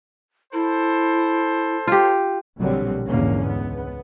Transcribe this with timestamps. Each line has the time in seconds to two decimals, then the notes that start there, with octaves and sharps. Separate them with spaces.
0.53 E4 A4 C5
1.87 F4 G4
2.58 A#1 B2 D3 F#3 G3 C4
3.06 A#1 E2 G#2 D3 A#3 C#4
3.46 C#2 B3